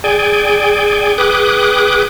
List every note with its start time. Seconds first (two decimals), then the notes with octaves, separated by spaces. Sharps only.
0.04 G#4 D5 G5 G#5
1.18 G#4 B4 G5 D6 D#6 F#6